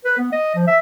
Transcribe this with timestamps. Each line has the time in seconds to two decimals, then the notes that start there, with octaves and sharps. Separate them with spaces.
0.05 B4
0.18 B3
0.32 D#5
0.55 F3
0.68 E5